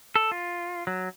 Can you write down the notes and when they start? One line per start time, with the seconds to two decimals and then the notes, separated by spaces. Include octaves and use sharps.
0.16 A4
0.32 F4
0.87 F#3